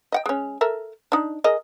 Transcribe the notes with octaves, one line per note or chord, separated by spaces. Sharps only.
D#5 F#5 G5
G#3 C#4
A4 A#4 E5
D4 D#4
G#4 A#4 D#5